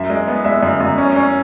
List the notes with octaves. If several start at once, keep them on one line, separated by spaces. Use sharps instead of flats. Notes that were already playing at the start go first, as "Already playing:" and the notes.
Already playing: F#2 E5
G#3
B3
G#3 E5
F#2
F#2
C#4
C#4